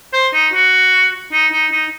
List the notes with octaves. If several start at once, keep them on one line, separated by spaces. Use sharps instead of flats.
C5
D#4
F#4
D#4
D#4
D#4